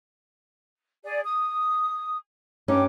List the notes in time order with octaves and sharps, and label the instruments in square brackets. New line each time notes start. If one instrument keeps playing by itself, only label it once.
[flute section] G#4 D5
D#6
[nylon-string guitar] G2 C#4 D#4 [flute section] G5 D6